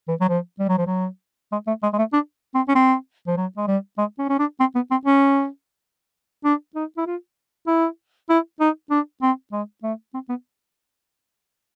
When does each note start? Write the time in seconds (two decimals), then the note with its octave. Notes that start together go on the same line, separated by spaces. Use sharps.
0.08 E3
0.21 F#3
0.29 F3
0.59 G3
0.69 F#3
0.78 F3
0.87 F#3
1.52 G#3
1.67 A3
1.83 G#3
1.94 G#3
1.98 A3
2.13 D4
2.55 C4
2.69 C#4
2.75 C4
3.27 F3
3.37 F#3
3.57 G#3
3.68 G3
3.98 G#3
4.19 C#4
4.30 C#4
4.39 D4
4.60 C4
4.75 B3
4.91 C4
5.05 C#4
6.45 D4
6.75 D#4
6.97 E4
7.07 F4
7.67 E4
8.30 E4
8.60 D#4
8.91 D4
9.22 C4
9.53 G#3
9.83 A3
10.14 C4
10.29 B3